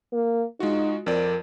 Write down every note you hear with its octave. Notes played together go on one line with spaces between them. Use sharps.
A#3
G#3 D#4 F4 F#4
F2 C4 A#4 D5